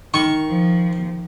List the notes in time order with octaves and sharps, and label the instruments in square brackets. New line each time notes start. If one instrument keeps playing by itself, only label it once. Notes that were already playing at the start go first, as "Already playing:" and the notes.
[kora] D#3 [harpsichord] C#6
[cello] F3